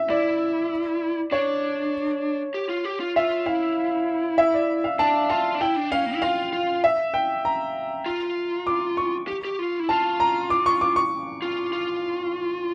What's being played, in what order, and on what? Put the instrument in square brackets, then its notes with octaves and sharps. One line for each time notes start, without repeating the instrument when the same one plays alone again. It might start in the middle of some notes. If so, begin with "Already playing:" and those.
Already playing: [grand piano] E5 E6
[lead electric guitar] E4 [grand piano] D5
[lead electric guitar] D4 [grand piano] C#5
[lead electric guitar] G4
F4
G4
F4
[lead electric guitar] F4 [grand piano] E5
[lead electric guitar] E4 [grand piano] F5
[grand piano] E5
D5
F5
[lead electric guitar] D4 [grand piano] A5
[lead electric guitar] F4 [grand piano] A5
[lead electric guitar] D4
[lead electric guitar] E4 [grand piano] G5
[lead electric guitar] D4
[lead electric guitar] C#4 [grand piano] F5
[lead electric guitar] A#3
E4
[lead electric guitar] F4 [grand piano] F5
[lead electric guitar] F4
[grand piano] E5
G5
A#5
[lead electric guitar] F4
[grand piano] D6
C#6
[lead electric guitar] G4
G4
F4
E4
[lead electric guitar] F4 [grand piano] A5
[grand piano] A#5
D6
C#6
D6
C#6
[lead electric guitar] F4
F4